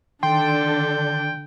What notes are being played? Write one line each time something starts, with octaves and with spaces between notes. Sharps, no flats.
D3 D#3 D4 A4 G5 C6